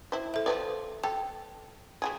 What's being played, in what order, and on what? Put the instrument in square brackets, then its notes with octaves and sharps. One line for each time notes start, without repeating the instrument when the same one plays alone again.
[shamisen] E4 C5
[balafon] A4 E5
[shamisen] F3 A#4 D5 [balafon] B4
[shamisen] A4 [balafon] G5
[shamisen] C#3 F#3 G#4